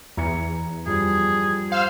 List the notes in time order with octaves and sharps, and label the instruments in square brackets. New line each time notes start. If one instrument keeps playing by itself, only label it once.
[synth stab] E2 [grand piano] A#5 G#6 C#7
[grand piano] G2 F3 G3 [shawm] G#4
[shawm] C5 [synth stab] F5 E6 F6